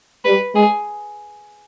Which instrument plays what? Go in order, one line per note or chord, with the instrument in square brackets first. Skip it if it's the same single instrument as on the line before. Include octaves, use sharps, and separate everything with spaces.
[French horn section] G3 [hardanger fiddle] B4
[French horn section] G#3 [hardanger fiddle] G#4